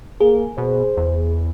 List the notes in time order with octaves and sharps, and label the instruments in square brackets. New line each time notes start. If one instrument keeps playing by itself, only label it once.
[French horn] A#3 [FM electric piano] G#4
[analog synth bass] B2 [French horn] C5
[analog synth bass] E2